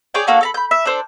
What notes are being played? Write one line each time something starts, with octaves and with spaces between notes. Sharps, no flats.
G#4 C#5 D5 G5
A#3 D4 F#4 A4
A4 A#5 B5
B5 G6
E5
D4 A4 C5